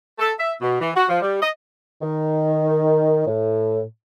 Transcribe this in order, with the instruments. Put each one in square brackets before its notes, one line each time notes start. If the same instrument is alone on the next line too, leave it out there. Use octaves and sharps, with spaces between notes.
[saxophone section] A4
E5
B2
E3
F#4
F3
G3
D#5
[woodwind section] D#3
A2